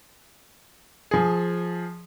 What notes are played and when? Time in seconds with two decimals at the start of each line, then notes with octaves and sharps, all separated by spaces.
1.11 F3 G#4